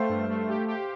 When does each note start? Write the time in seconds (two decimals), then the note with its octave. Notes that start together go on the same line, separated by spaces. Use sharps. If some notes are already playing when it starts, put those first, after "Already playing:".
Already playing: A3 C5 F5 G5
0.09 G2
0.29 A3
0.49 G4
0.68 G4